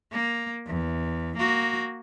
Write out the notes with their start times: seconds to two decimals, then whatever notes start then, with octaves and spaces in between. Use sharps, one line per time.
0.12 A#3
0.67 E2
1.37 A#3 F#4